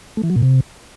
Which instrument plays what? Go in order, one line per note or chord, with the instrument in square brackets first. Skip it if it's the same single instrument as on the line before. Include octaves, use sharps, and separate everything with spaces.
[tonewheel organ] A3
E3
F#3
A#2
C3